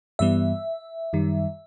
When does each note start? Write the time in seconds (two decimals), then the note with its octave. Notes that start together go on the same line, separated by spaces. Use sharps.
0.19 G2 E3 G3 B3 E5
1.13 F#2 D#3 G3